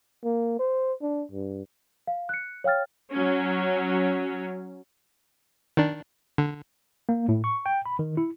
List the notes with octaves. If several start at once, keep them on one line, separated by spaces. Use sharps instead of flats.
A#3
C5
D4
G2
F5
F#6 C#7
C#5 F5 G5 F6 A6
F#3 C#4
D#3 D4
D3
A#3
A2
C#6
G5
B5
D#3
E4